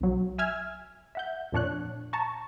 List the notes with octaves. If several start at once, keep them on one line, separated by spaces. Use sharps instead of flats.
B1 F#3
E5 G#5 E6 F6 G#6
E5 F#5 G6
F2 A#2 D4 C#5 F#6
A5 A#5 C#6